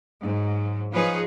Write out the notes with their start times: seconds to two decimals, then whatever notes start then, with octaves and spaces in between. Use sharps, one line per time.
0.22 G#2 F#3
0.92 F3 D#4 F4 G#4 B4 C#5